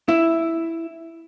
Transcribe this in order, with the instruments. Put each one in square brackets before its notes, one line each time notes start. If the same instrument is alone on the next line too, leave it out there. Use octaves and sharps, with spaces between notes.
[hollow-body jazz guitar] E4